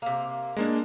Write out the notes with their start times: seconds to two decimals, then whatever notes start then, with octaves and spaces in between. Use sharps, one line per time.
0.02 C3 A#3
0.56 G#3 A#3 D4